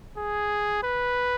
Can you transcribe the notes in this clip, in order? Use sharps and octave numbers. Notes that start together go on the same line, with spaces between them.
G#4
B4